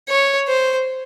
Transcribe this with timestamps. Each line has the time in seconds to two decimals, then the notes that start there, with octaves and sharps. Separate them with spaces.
0.08 C#5
0.48 C5